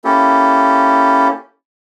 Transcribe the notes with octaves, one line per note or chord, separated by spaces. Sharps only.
A#3 C#4 E4 G4 A4